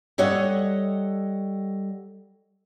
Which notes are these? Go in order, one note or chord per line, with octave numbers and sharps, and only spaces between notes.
G3 A4 C#5 D#5 F#5